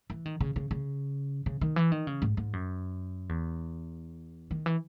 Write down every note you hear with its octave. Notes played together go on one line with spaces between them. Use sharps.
E3
D#3
C#3
C#3
C#3
C#3
D#3
E3
D#3
C#3
G#2
G#2
F#2
E2
D#3
E3